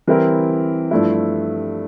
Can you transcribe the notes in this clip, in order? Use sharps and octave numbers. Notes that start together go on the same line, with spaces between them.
E3 G3 C4 E4 A#4
G2 F3 A3 E4